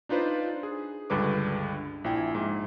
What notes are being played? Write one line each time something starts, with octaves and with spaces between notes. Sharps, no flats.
D4 D#4 F4 B4 C5 D5
G#4
C#2 G2 D3 B4 D6
A#1 E4 G5 G#5
G#2